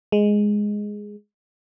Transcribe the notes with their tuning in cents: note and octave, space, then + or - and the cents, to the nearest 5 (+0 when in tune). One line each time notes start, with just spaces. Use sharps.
G#3 +0